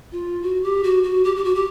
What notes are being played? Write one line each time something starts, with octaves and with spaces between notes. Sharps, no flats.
F4
F#4
G4
F#4
F#4
G4
G4
F#4
G4